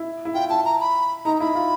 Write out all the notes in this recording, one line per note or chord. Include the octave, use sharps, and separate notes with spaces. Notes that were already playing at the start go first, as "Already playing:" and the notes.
Already playing: E4
E4
F4 G5
E4 A5
A#5
B5
D#4 A#5
A#5
E4 B5
F4